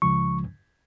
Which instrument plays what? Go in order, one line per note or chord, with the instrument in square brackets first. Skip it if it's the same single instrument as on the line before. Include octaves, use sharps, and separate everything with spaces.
[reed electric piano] C#2 C#3 F3 G#3 C#6